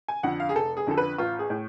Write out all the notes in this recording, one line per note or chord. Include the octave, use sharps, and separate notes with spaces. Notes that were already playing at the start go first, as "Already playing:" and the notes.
G#5
F2 D3 F#5
F5
G#4
F1 A4
G#4
F2 D3 A4
B4
A1 F4
G#4
A2